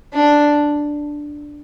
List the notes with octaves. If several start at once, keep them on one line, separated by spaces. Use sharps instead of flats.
D4